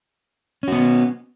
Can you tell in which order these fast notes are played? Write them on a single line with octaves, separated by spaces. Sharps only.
C#4 F#4 B3